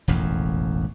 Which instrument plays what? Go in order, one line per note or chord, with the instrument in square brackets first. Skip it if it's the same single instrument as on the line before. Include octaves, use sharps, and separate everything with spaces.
[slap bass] E1 A1 F2